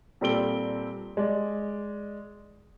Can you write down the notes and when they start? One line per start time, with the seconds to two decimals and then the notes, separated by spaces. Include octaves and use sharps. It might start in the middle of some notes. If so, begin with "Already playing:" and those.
0.21 A#2 G3 C4 A4 D7 G7
1.17 G#3 D5